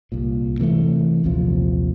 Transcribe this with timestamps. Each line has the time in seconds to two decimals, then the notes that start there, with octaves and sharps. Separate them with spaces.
0.12 C2 A#2
0.60 C3 E3 F3 A3
1.24 A#1 D#2 C3 F3